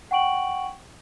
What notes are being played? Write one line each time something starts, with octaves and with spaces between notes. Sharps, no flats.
F#5 G5 C#6 D7 F#7